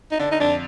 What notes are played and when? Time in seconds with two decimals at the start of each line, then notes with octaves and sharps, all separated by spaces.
0.12 D#4
0.19 D3 D4
0.31 D#4
0.40 F2 D4